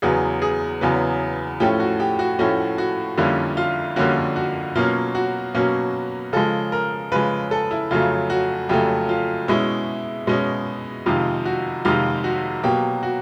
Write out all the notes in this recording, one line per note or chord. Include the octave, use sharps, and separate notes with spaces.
E2 C#3 F#3 B3 G#4
G#4
E2 C#3 F#3 B3
A2 F3 A3 C#4 G4
F#4
G4
F#4
A2 F3 A3 C#4 F#4
F#4
F2 D3 G3 A#3 C#4 E4
F4
F2 D3 G3 A#3 C#4 F#4
F#4
B2 F#3 A#3 C#4 F4
F#4
B2 F#3 A#3 C#4
C#3 F3 G#3 A4
A#4
C#3 F3 G#3 B4
A4
E4
F2 C#3 F#3 A3 F4
F#4
F2 C#3 F#3 A3 G4
F4
B2 G#3 C#4 E4
B2 G#3 C#4
F2 C3 D#3 G#3 F4
F#4
F2 C3 D#3 G#3 F4
F#4
B2 F#3 A#3 G4
F#4